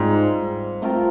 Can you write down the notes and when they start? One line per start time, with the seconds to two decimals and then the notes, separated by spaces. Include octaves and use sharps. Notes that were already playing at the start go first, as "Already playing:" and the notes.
Already playing: G#2 G3 C4 F4
0.82 A3 C4 F4 A#4